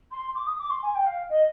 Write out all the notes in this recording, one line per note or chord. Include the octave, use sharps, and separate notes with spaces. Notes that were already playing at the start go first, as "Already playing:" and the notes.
C6
D6
D#6
D6
C6
G#5
G5
F5
D#5